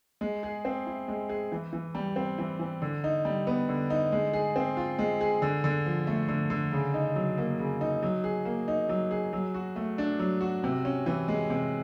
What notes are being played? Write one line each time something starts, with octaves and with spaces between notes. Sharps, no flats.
G#3
G#4
C4
E4
G#3
G#4
E3
E3
G3
C4
E3
E3
D3
D#4
G3
B3
D3
D#4
G#3
G#4
C4
F4
G#3
G#4
D3
D3
F3
A3
D3
D3
C#3
D#4
F#3
A#3
C#3
D#4
F#3
G#4
A#3
D#4
F#3
G#4
F#3
F#4
A3
D4
F#3
F#4
C3
C#4
E3
G#3
C3